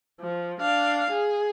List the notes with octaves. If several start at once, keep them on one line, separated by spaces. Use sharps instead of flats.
F3
D4 F5
G#4